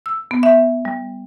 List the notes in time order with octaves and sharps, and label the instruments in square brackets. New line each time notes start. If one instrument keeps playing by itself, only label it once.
[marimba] E6
B3
E5
G3